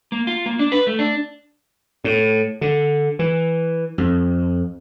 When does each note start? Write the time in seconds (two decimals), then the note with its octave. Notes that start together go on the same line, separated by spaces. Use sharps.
0.12 A#3
0.27 F4
0.46 A#3
0.59 D4
0.72 B4
0.87 A3
0.99 D4
2.04 A2
2.61 D3
3.19 E3
3.98 F2